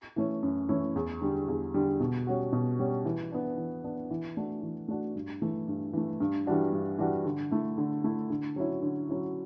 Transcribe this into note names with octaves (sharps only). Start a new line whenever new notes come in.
E3 A3 C#4 E4
F#2
E3 A3 C#4 E4
E2
D3 G3
E2
D3 G3
B2
G3 C#4 F#4
B2
G3 C#4 F#4
E3
B3 D4
E3
B3 D4
E3
A3 D4 F#4
E3
A3 D4 F#4
G2
E3 A3
G2
E3 A3
G2
E3 G3 D4 F#4
G2
E3 G3 D4 F#4
D3
A3 E4
D3
A3 E4
D3
F#3 C#4 E4
D3
F#3 C#4 E4